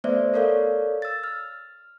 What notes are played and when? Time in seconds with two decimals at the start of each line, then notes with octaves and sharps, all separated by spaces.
0.04 A3 B3 C5 D5 E5
0.34 A4 A#4 C#5 D5 F5
1.02 E6 A6
1.24 F6